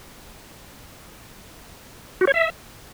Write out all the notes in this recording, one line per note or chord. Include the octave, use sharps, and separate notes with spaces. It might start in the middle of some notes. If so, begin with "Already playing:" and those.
F#4
C#5
E5